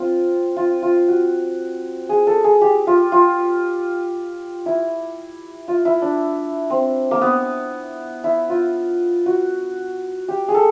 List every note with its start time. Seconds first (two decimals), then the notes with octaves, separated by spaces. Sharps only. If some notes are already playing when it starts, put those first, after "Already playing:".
Already playing: C4 F4
0.57 F4
0.82 F4
1.08 F#4
2.09 G#4
2.27 A4
2.44 G#4
2.61 G4
2.87 F4
3.12 F4
4.66 E4
5.68 F4
5.85 E4
6.02 D4
6.70 C4
7.11 A#3
7.21 B3
8.24 E4
8.49 F4
9.26 F#4
10.28 G4
10.48 G#4
10.54 A4